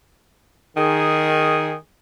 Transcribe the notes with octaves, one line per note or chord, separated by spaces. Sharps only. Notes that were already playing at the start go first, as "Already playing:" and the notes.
D#3 G#4